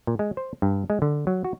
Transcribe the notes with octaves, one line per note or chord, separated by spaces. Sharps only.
A#2
G#3
C5
G2
G#3
D3
F#3
F#4